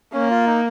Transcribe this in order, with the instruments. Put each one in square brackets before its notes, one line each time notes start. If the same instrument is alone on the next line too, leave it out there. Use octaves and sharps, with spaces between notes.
[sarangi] A#3 [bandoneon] C#4
[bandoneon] F4
D#4